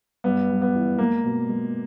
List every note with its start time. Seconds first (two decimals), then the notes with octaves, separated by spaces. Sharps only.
0.24 G2 B3
0.50 G3
0.62 B3
0.74 E3
0.98 G#3 A#3
1.24 B2
1.49 G#3